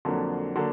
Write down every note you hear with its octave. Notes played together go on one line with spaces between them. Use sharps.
F2 D3 F#3 A#3 D4
D3 F#3 A#3 D4